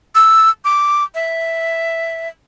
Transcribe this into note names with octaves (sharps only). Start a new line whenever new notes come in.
E6
D6
E5